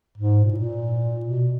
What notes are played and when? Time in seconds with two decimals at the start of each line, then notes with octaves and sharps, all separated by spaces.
0.17 G#2
0.44 A#2
0.52 A2
0.59 A#2
1.25 B2